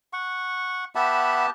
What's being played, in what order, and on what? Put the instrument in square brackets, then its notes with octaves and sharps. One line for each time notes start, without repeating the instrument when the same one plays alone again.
[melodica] F#5 C#6
[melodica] B3 G4 A5 [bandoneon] E5 F#5 B5